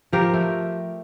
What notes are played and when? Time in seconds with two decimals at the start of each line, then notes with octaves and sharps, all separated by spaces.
0.12 F3 G4 A#4
0.34 A3